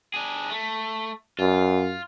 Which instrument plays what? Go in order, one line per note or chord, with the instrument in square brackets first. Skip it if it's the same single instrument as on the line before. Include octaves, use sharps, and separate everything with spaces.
[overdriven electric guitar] D4 G#4
A3
[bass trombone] F#2 [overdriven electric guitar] F4